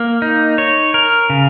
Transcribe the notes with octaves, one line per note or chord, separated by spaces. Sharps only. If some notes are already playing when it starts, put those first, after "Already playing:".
Already playing: A#3
D#4
C#5
A#4
C#3